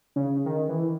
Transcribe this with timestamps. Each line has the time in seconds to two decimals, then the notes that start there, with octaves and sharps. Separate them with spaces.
0.16 C#3
0.46 D#3
0.69 E3